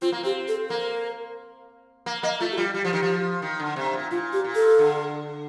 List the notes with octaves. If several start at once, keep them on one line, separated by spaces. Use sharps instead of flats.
C4 F4
A#3
C4 G4
A4
A#3 A#4
A#3
A#3 D#5
A3 F4
G4
G3 F4
G3 G4
F3
D#3
F3
D#3
D3
C3
A#2
A#2 F4
G4
A#2
A4
D3